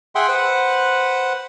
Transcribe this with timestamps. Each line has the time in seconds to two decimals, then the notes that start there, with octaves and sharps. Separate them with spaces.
0.15 G#4 E5 F#5 G5 C6
0.28 B4 C5 F#5